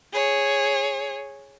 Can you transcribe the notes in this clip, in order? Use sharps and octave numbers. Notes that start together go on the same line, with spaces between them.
G#4 C#5